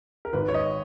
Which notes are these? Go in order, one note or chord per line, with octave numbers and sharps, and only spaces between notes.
A#4
G#1 B4
C#5
D#5